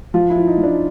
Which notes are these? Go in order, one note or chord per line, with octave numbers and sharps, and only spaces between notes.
F3 F4
E4
F3
D#4
F3
D4